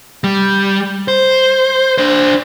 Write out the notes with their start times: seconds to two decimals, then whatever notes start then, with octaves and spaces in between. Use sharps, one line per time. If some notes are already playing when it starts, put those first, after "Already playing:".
0.24 G3
1.08 C5
1.98 D4 C5